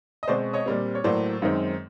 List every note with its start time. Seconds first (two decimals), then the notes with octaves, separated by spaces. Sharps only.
0.23 D#5
0.28 B2 G#3 C4 C5 D5
0.53 C#5 D#5
0.66 A#2 G3 C4
0.95 C#5
1.04 A2 F#3 A#3 C5 D5
1.42 F#2 D#3 G#3 C4 D#4